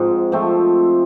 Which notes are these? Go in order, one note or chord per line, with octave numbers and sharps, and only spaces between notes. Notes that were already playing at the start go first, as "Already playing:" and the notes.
Already playing: G#2 F3 C4
F3 A3 C4